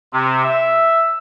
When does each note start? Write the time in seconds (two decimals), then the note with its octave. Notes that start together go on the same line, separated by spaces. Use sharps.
0.12 C3
0.44 E5